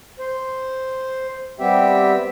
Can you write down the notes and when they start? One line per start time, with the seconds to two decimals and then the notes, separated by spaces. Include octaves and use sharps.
0.19 C5
1.60 G3 B3 C4 G4 E5 G5